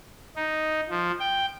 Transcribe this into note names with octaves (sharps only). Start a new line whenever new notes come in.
D#4
F3
G5